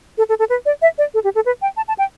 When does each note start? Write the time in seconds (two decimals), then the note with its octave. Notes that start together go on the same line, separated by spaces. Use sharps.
0.18 A4
0.29 A4
0.39 A4
0.50 B4
0.66 D5
0.82 E5
0.98 D5
1.14 A4
1.24 G4
1.35 A4
1.46 B4
1.62 G5
1.77 A5
1.88 A5
1.99 G5